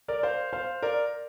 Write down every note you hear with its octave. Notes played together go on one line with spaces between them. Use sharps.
A#4 D5
C5 F5
C5 F5
A#4 D5